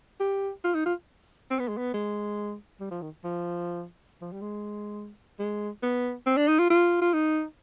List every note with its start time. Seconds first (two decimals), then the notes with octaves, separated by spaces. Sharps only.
0.20 G4
0.64 F4
0.74 D#4
0.86 F4
1.51 C4
1.59 B3
1.68 G#3
1.77 B3
1.94 G#3
2.80 G3
2.91 F3
3.02 D#3
3.24 F3
4.21 F3
4.32 G3
4.42 G#3
5.39 G#3
5.83 B3
6.26 C4
6.37 D4
6.48 D#4
6.59 F4
6.70 F4
7.01 F4
7.13 D#4